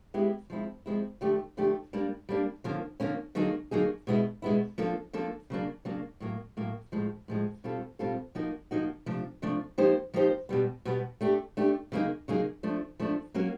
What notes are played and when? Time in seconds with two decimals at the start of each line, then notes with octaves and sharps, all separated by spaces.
0.14 G#3 B3 E4 G4
0.50 F3 G#3 C4 E4
0.86 F3 G#3 C4 E4
1.21 D3 F3 A3 D4 G4
1.57 D3 F3 A3 D4 G4
1.93 G3 A#3 D4
2.29 G3 A#3 D4
2.64 D3 F3 A#3 C#4
3.00 D3 F3 A#3 C#4
3.35 D3 F#3 A#3 D#4 G#4
3.71 D3 F#3 A#3 D#4 G#4
4.07 B2 G#3 B3 E4
4.42 B2 G#3 B3 E4
4.78 F3 A#3 D4 F4 A4
5.13 F3 A#3 D4 F4 A4
5.50 C#3 F#3 A#3 D4
5.85 C#3 F#3 A#3 D4
6.20 A2 F#3 A#3
6.57 A2 F#3 A#3
6.92 A2 F3 G#3
7.28 A2 F3 G#3
7.64 B2 G3 C4 F4 A4
7.99 B2 G3 C4 F4 A4
8.35 F3 A#3 D#4 F#4 A#4
8.71 F3 A#3 D#4 F#4 A#4
9.06 C3 F3 A3 D4
9.42 C3 F3 A3 D4
9.78 F3 A#3 D#4 G4 C5
10.14 F3 A#3 D#4 G4 C5
10.49 B2 G3 B3
10.85 B2 G3 B3
11.21 A3 D4 G4
11.57 A3 D4 G4
11.92 C#3 F#3 A#3 D#4 G#4
12.28 C#3 F#3 A#3 D#4 G#4
12.63 F3 A3 D4
13.00 F3 A3 D4
13.34 F#3 A#3 C#4 F#4 A#4